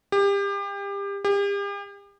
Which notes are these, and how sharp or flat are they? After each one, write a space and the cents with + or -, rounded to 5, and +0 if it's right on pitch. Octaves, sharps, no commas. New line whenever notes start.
G4 +30
G4 +40